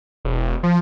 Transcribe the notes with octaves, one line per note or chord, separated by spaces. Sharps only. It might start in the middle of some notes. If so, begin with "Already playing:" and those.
E1
F3